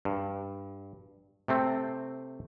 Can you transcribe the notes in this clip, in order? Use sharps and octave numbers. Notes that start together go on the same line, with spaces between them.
G2
C3 A3 C4